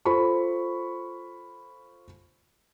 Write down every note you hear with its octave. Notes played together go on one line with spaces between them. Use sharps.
F4 A4 C5 B5 C#6